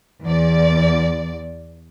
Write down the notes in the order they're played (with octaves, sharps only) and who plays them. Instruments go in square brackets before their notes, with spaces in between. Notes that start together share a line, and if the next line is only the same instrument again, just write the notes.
[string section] E2 D5